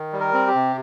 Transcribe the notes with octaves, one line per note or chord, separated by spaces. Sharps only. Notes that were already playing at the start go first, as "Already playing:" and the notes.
Already playing: D#3
G3
A#4
C4
G4
C3